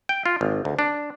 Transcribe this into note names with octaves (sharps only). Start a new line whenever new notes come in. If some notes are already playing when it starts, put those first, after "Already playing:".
G5
F4
G#1
D2
D4